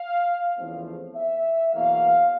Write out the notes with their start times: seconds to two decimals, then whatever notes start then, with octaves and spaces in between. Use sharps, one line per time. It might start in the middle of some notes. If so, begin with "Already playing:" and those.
Already playing: F5
0.56 E2 C#3 F3 A3 C4
1.15 E5
1.72 E2 B2 F#3 A#3 F5